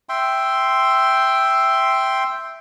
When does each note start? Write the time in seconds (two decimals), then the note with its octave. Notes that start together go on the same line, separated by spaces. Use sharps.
0.09 E5 G5 C6